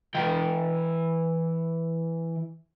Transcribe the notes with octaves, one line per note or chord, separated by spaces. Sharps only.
E3 G5